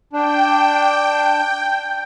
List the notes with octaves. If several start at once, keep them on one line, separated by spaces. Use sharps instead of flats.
D4 G5